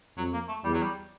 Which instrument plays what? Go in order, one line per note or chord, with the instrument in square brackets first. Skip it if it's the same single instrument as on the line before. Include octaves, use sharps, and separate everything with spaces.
[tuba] F2 [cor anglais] F#3
[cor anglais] A#3
A3
[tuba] E2 [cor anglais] G3
[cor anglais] F#3
G3